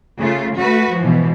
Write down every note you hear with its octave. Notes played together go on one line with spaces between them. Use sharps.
C#3 A3 F4
A3 F#4 B4
G#2 B2 E3 F3